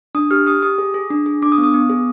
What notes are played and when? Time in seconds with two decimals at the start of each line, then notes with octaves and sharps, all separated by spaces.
0.15 D4 D#6
0.31 G4 F6
0.47 G4 D#6
0.62 G4 D#6
0.78 G#4
0.94 G#4
1.10 D4
1.26 G#4
1.42 D4 D6
1.52 D#6
1.58 B3
1.63 D#6
1.74 B3
1.89 G#4